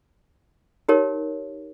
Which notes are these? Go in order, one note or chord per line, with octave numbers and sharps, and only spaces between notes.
D#4 G4 A#4 C#5